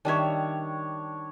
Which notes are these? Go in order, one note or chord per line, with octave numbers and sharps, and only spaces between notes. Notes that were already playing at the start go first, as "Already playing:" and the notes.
D#3 G3 D4 C#5 E5